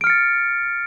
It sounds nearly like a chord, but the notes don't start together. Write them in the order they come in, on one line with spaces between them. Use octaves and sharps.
D7 F6 C#7 A6